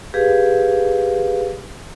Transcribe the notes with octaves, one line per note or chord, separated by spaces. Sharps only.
G4 G#4 B4 F5